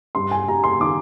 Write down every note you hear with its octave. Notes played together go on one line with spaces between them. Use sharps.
G2 C6
G#5
G3 A#5
C6
D#3 D6